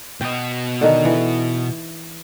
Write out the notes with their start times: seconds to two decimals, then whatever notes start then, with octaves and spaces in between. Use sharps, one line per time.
0.21 B2 D#5 G5
0.81 D3 D#3
1.05 E3